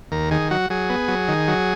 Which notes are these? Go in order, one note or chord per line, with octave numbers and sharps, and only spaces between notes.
D#2 A#4
D#3 G#4
F#3 F#4
F#3 G#4
B3
F#3
D#3
F#3